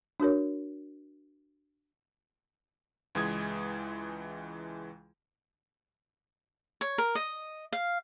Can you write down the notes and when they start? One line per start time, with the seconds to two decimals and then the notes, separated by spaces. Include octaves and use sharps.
0.20 D4 F#4 A#4 C#5
3.15 C#2 E3 G#3 D#6 G#6
6.81 C#5
6.98 A#4
7.15 D#5
7.73 F5